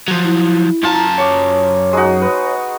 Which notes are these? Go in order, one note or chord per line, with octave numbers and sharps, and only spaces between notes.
F3 F#3
E4
F#2 F4 A5 A#5
C#5 C#6 D6
G#3 D#4 F#4
B4